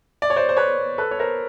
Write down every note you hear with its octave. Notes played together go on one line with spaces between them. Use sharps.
D5
C#5
C5 D5
C5
B4 C#5
A4 B4
C#5
A#4 C5